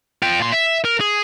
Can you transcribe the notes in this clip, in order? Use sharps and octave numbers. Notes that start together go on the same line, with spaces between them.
F4 G5
A#2 C6
E5
A#4
G#4